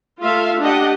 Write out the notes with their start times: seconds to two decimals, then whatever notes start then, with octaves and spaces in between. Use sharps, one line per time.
0.21 A3 F4 A4 E5 F5
0.61 D4 G4 D#5 F#5